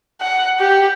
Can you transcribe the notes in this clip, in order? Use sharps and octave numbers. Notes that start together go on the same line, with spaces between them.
F#5
G4